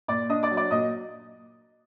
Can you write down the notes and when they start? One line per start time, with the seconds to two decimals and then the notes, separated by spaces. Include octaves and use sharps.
0.08 A#2 D5 D6
0.29 D4 D#5 D#6
0.43 D5 D6
0.51 F#3
0.57 D5 D6
0.71 A#2 D#5 D#6